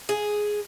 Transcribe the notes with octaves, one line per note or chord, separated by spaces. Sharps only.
G#4